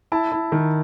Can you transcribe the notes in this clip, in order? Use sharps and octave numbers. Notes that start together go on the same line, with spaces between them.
E4 A5
E4
D#3